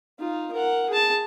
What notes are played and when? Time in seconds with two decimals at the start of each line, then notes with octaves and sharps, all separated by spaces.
0.20 D#4 F4
0.53 A#4 F#5
0.89 G#4 A5